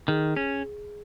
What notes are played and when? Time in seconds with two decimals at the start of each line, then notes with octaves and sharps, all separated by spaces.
0.08 D#3 G#4
0.36 C#4 G#4